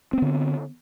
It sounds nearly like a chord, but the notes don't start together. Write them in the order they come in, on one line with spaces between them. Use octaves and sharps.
C4 B3 D3